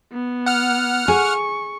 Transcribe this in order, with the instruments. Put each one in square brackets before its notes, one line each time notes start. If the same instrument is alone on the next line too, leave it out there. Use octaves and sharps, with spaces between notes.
[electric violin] B3
[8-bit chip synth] F#5 F6
[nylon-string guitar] G#4 [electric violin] C#6